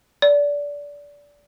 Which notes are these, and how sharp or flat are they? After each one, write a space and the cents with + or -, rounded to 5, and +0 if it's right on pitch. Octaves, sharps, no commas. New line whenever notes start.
D5 -20